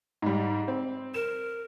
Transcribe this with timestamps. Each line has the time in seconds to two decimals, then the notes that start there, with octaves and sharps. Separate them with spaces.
0.22 G#2 G3
0.68 C4
1.14 A#4 E7